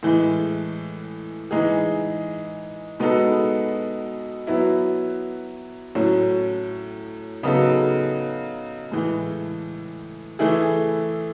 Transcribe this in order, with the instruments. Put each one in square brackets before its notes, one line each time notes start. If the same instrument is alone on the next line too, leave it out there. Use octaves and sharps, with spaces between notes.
[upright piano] A2 E3 G#3
E3 G#3 D#4 G#4
B2 G#3 B3 D#4 A4
F#3 B3 E4
A2 F#3 C#4
C#3 F#3 B3 D#4 A4
A2 E3 G#3
E3 A3 E4 G#4